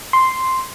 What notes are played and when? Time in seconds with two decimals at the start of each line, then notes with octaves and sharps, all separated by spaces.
0.13 C6